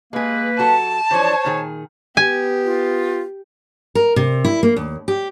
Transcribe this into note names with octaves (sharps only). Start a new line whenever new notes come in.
G#3 A#3 G#4 B4
F#3 F#4 A4 A5
E3 F3 D4 C5 C#5
A#2 D#3 G#4
B3 G4 G#5
F4
A#4
C3
E4
A#3
D#2
G4